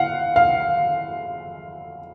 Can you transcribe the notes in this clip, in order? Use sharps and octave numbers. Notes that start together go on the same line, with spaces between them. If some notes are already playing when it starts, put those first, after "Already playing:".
Already playing: F5 F#5
F5